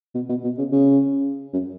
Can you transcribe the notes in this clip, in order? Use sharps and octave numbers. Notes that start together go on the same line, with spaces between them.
B2
B2
B2
C#3
C#3
F#2